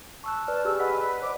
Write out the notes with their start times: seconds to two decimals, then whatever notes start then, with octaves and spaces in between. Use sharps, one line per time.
0.24 A5 C#6 E6 F#6
0.48 B4 D5 F6
0.65 G4 G#4 G#5 E6
0.80 B4 D#5 F#5 B6
1.22 C5 D5 D#5 D6